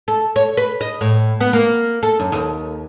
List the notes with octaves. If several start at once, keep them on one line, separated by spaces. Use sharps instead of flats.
A4
C#5
B4
D#5
A2
B3
A#3
A4
F#2
D#2